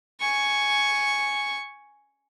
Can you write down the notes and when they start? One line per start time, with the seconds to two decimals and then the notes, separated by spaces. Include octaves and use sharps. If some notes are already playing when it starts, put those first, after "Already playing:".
0.20 G#5 C#6